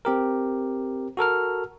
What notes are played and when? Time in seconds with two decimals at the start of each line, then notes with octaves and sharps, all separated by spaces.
0.05 C4 G4 A#4
1.17 F#4 A4 A#4 F6